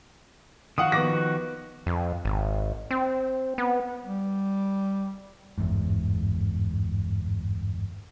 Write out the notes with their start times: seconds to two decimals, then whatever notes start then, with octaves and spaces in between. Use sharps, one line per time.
0.78 D#3 F3 F#4 F5 F#5 D#6
0.92 B3 D6 A#6
1.86 F2
2.25 G#1
2.91 C4
3.58 B3
4.06 G3
5.58 G1 E2 G#2